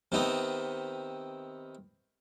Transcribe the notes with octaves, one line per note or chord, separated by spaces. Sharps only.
C3 D#3 B3 C4